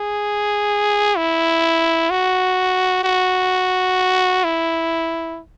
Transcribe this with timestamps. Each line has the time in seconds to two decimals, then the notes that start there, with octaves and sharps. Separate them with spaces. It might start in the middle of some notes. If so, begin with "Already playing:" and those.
Already playing: G#4
1.17 E4
2.10 F#4
3.04 F#4
4.44 E4